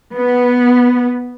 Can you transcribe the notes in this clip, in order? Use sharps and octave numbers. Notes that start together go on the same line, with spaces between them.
B3